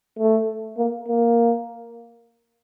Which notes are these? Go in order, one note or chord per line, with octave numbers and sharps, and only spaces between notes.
A3
A#3
A#3